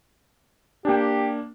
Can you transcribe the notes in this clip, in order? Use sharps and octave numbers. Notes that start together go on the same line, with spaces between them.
A#3 D4 G4